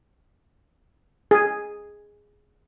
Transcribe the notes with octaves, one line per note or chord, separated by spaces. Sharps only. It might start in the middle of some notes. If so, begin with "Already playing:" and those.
G#4